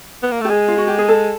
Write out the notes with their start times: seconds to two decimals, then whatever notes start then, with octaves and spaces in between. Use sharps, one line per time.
0.22 B3
0.31 A#3
0.41 A3 G4
0.50 G#3 G#4
0.68 F4
0.78 F#4
0.87 G4
0.98 G#4
1.08 A4